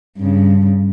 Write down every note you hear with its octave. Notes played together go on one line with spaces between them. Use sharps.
G2 C#3